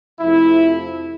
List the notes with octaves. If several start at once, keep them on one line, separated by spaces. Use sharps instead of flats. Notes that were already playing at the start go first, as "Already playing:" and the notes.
F2 C3 F3 A3 E4